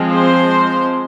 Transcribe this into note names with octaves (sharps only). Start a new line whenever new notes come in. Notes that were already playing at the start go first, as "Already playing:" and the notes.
Already playing: F3 G#3 C4
C5